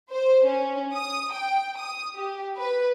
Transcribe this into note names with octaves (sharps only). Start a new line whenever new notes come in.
C5
C#4
D#6
G5
D#6
G4
B4